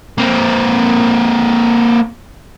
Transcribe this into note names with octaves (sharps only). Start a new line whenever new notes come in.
A#3 C4